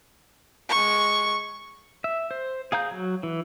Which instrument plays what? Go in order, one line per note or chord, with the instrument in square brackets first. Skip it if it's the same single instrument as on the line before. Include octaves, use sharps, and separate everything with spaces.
[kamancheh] G#3 C#6
[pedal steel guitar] E5
C5
G#4 F5 A#5 G6
F#3
E3